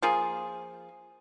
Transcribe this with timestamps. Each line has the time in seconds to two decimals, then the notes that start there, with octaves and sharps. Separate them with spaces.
0.02 F3 A#3 F4 G#4